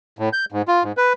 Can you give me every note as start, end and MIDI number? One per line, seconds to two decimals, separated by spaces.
0.19 0.29 45
0.33 0.45 91
0.52 0.62 44
0.68 0.83 65
0.83 0.92 44
0.97 1.13 71